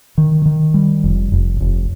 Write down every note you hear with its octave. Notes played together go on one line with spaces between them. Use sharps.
D#3
D#3
G3
F1
F1
F1